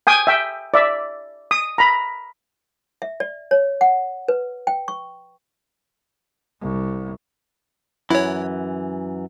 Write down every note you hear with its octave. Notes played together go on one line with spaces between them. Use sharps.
G5 G#5 D#6
E5 G5
D5 E5
D#6
A#5 B5
E5
D5
C#5
F#5
B4
G5
C#6
C2
F#2 E3 E4 C#5